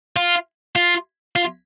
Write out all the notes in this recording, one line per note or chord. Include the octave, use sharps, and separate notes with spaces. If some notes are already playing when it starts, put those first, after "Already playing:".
F4
F4
F4